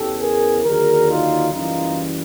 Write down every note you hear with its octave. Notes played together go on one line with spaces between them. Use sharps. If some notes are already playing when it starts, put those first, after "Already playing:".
Already playing: E2 C#3 E3 G4 A4
G#4 A#4
D#2 D3 F#3 G#4 A#4
D#4 F4
F#1 F#2 C#3 E3 G3 D#4 F4